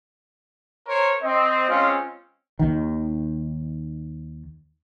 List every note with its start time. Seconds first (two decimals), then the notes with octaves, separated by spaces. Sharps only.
0.88 A#4 C5 C#5
1.23 C4 D#5
1.69 G#3 C4 C#4 F4
2.59 D#2 D#3